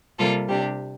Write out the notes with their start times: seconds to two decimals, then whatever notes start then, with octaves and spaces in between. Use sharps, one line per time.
0.17 C3 G3 A#3 F4 A4
0.48 C3 G3 D4 G4